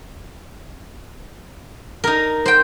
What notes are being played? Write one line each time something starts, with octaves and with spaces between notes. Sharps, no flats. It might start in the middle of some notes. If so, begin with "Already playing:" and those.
D#4 A#4
C5 G5